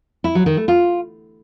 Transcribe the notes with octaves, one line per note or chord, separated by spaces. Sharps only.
E4
F#3
D#3
A3
F4